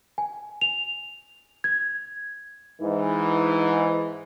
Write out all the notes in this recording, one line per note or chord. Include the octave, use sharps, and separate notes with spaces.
G#5
F7
G#6
G#2 E3